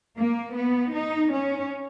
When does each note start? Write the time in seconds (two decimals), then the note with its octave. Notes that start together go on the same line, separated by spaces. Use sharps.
0.19 A#3
0.56 B3
0.94 D#4
1.32 C#4